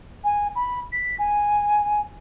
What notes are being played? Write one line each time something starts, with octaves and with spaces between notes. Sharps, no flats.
G#5
B5
B6
G#5